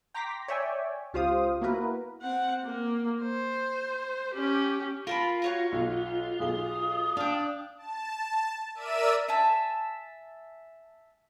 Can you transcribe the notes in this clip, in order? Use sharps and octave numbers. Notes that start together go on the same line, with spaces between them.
G5 A#5 C6 D6 A#6 B6
C#5 D5 E5 G5 G#5
C#2 F4 G4 C5 F5 D#6
A#3 B3 E4 F#4 A#4 B4
C4 F#5
A#3
C5
C#4 G4
F4 A#4 A5 B5
F#4 C#5 A#5
B1
B1 G#4 D#6 G7
D4 F5 G5
A5
A#4 D5 E5 E6 D#7
E5 G#5 A5